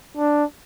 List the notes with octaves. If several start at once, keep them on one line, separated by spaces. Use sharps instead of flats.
D4